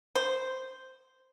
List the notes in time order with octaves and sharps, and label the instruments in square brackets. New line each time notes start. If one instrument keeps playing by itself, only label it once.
[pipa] C5